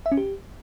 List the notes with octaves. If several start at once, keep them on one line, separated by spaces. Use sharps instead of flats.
E5
C#4
G4